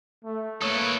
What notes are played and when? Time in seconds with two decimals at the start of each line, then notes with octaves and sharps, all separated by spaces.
0.24 A3
0.62 A#3 E4 A4 B4 C#5 D#6